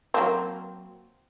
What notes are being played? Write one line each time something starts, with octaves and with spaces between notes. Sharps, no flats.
F#3 A#3 C4